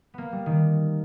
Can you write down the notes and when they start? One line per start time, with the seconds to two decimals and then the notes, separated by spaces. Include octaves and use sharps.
0.14 A#3 B3
0.32 G3
0.46 D#3